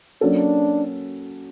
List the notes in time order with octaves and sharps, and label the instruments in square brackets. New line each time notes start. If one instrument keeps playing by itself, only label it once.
[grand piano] F#3 A#3 C#4 F#4 A4 [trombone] D4